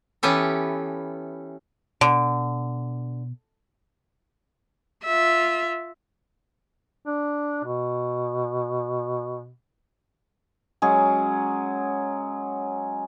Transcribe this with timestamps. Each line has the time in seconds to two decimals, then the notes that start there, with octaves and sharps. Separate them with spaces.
0.23 E3 B3 C#4 G4 A4
2.01 B2 D3
5.05 F4 E5
7.07 D4
7.64 B2
10.82 F#3 G#3 C#4 G#4